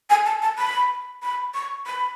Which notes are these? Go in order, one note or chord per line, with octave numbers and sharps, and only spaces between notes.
G#5
A5
A5
B5
B5
C#6
B5